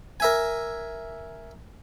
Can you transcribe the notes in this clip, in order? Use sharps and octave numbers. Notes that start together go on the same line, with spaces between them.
A#4 E5 G#5